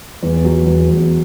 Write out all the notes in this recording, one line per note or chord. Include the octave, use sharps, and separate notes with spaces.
E2
F#3
E2
E2